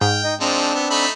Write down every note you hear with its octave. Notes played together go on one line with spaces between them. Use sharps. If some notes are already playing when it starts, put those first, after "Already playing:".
G#2 G5 F6
D#4 D#5
F3 G#3 C4 D4 D#4 E6
B3
A3 D#4 B5